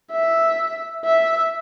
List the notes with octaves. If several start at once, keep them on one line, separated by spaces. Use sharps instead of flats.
E5
E5